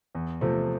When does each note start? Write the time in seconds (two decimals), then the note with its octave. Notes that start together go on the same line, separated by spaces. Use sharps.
0.15 E2
0.41 C3 F3 A3